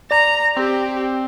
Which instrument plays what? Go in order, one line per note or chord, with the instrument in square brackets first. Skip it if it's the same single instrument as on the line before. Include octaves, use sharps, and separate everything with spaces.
[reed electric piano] D5 [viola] A#5
[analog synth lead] C4 [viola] G4